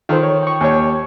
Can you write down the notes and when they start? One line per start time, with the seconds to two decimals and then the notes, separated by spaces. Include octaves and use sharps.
0.09 D#3 F4 A4 C5
0.23 C#5
0.43 G5 C#6
0.61 D#2 C#5